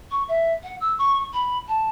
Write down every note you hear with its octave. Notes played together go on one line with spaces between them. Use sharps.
C#6
E5
F#5
E6
C#6
B5
A5